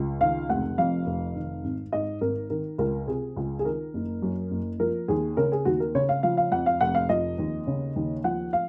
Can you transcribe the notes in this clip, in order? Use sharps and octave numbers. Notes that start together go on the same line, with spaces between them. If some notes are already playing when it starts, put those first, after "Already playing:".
Already playing: C#2
D#3 F5
F1 F#5
F2 F5
F1
D#3
G#1
G#2 D#5
G#1 A#4
D#3 A#4
C#2 A#4
C3 G#4
C#2
G#4
D#3 A#4
F#1
F#2
F#1
F3 A#4
D#2 G#4
C#3 A#4
G#4
D#2 F#4
A#4
C#3 C#5
F5
F3 F5
F5
F2 F#5
F5
F1 F#5
F5
F3 D#5
D#2
C#3
D#2
F3 F#5
F5